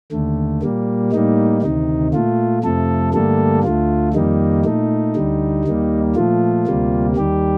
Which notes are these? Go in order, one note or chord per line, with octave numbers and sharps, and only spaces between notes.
D#2 D3 A3
A#2 G3 A#3
A2 G3 A#3 D#4
D2 C3 D#3 D#4
A#2 A3 F4
F2 C3 F3 A3 A4
G2 D3 G3 A3 A#3 A4
D2 D3 A3 F4
F2 D#3 G3 A#3 D#4
A#2 A3 D#4
D2 D3 G3
D#2 D#3 G3 A#3
A#2 F3 A3 F4
D2 C3 G3 A#3
D#2 D#3 G3 G4